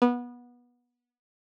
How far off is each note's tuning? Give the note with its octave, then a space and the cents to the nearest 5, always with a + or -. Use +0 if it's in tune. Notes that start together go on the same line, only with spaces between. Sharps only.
B3 -20